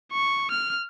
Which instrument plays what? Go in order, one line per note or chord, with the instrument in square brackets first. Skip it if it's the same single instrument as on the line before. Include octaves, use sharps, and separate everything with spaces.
[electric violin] C#6
F6